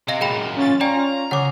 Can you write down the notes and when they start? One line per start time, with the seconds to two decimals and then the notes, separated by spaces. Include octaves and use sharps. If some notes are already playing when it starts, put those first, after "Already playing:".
0.08 C3 D#5 F5 A#6
0.21 F#2 A#2 G#4 G5 B5
0.56 C#4 F4 A6
0.81 C#4 F4 D5 G5 G#5 A#5
1.31 C#3 F#5 D6